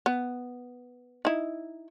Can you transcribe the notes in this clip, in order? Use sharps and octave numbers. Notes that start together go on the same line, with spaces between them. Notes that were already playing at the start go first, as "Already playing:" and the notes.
B3
D#4 E4